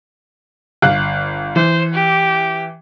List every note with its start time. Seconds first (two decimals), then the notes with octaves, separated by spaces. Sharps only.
0.82 G1 F5 F#6
1.56 E3 C5
1.94 G4